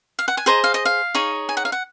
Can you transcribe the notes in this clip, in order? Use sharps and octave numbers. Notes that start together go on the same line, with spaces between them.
F5
F#5
G#5
G#4 C5 D#5 A#5
F5
D#5
F5
D#4 G#4 C#5
G#5
F#5
F5
F#5